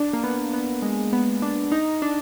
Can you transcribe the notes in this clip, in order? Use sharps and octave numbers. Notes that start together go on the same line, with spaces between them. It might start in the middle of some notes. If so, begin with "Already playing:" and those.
Already playing: D4
A#3
B3
B3
G#3
B3
D4
D#4
D4